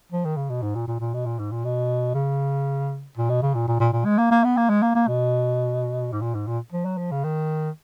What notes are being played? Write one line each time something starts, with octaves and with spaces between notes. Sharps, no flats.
F3
D#3
C#3
B2
G#2
A#2
A#2
A#2
B2
A#2
G#2
A#2
B2
C#3
A#2
B2
C#3
A#2
A#2
A#2
A#2
G#3
A#3
A#3
B3
A#3
G#3
A#3
A#3
B2
G#2
A#2
G#2
A#2
F3
F#3
F3
C#3
D#3